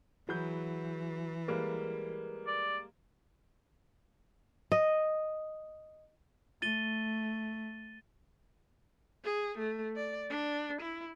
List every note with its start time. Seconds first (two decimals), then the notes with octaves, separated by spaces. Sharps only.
0.29 E3 F#3 G#4 F#5 B5 G6
1.48 G3 G#3 A#3 A#4 B4 B5
2.47 D5
4.72 D#5
6.62 A3 A6 D#7 G7
9.24 G#4
9.58 A3
9.96 D5
10.30 D4
10.81 E4